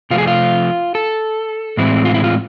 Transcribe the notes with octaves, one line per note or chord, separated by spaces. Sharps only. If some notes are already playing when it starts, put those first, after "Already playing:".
C3 F3 A3 C4 F4
G#4
F4
A4
A2 E3 G#3 C4 E4
F4
E4
F4